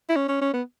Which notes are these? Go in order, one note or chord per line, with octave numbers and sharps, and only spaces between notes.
E4
C#4
C#4
C#4
B3